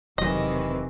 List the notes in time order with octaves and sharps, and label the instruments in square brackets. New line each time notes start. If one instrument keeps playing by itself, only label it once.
[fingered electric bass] E1 F#3 [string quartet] C3 D#3 [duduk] E3 [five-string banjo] D#5